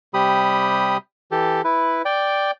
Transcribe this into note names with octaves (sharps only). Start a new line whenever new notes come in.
C3 G3 G4 B5 D#6
E3 G4 A4
E4 B4
D5 G5